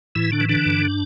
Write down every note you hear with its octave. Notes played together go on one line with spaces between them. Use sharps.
A2 E3 E4
D3 D4
E3
D3 D4
G2